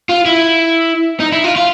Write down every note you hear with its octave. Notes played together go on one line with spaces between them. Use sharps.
F4
E4
D#4
E4
F4
F4